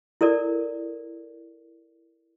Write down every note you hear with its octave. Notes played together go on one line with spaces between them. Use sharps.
E4 A4 A#4 D5